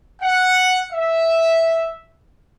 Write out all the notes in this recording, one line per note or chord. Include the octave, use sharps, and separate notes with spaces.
F#5
E5